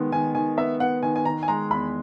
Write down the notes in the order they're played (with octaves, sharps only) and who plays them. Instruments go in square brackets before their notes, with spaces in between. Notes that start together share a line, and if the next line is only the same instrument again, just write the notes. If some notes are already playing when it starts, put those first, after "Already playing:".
Already playing: [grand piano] D#3 G#3 B3
[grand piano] D#3 [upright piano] G#5
[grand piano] D#3 [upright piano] G#5
[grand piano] B3 [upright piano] E5
[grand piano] B3 [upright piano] F#5
[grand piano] D#3 [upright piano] G#5
[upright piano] G#5
[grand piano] D#3 [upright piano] A#5
[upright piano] G#5
[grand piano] G#3 [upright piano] A#5
[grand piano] E2 [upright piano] B5